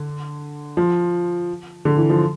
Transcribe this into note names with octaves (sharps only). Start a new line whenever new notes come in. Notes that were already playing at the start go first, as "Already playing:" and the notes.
Already playing: D3
F3
D3
E3
F3